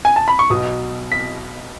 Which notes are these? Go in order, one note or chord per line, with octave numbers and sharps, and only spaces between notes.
G#5
A5
B5
C#6
B1 B2 D#6
B6